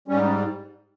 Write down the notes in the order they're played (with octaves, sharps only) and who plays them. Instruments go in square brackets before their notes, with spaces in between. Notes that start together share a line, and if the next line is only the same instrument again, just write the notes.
[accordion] G#2 G3 C#4